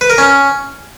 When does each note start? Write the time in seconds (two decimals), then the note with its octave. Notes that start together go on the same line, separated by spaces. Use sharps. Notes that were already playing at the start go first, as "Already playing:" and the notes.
0.01 B4
0.10 A#4
0.18 C#4